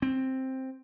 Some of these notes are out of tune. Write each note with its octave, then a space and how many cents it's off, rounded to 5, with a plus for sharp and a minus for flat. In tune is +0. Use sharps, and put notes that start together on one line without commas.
C4 +5